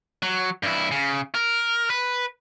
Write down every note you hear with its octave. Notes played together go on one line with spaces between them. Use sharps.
F#3
G2 E4
C#3
A#4
B4